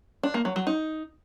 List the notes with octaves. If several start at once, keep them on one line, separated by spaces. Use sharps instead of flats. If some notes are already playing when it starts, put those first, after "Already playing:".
D4
A#3
F#3
F#3
D#4